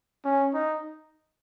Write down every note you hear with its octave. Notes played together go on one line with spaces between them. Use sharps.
C#4
D#4